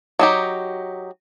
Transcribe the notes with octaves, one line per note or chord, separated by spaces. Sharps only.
F#3 D#4 G4